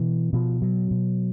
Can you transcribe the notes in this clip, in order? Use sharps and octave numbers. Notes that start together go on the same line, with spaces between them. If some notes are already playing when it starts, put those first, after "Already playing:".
Already playing: B2 E3
B2 F3
F#3
B2